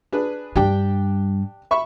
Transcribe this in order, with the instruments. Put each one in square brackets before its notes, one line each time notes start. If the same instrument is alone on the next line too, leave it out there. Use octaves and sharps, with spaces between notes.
[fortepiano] D4 G#4 B4
[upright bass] G2 G3 [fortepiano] D4 G4 G5
[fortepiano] E5 B5 C#6